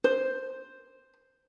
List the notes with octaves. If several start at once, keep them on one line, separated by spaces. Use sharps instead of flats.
C5